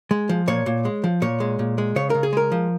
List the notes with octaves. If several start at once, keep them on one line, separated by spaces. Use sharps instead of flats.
G#3
F3
A#2 C#5
A#2
G#3
F3
A#2 C#5
G#3
A#2
G#3
C#3 C#5
C#3 A#4
G#4
G#3 A#4
F3